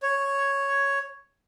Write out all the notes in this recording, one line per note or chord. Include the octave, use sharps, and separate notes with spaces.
C#5